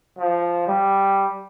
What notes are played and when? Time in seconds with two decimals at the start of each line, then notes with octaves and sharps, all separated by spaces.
0.18 F3
0.68 G3